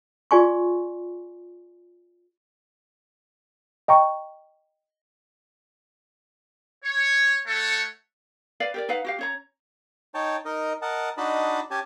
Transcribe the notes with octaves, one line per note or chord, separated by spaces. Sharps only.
F4 G#4 D5 G#5 C6 C#6
D#5 G5 A#5 C#6
C#5
A3 A4 C#5 F#5
B4 D5 F5
G4 A#4 D5
D#4 B4 F5 F#5
F#4 G4 F5
C#4 C#5 A#5
D#4 C#5 G5 A5
D#4 A#4 D#5
A#4 D#5 F#5 A5
D4 D#4 F#4 D#5 A5 B5
C#4 G4 G#5 A5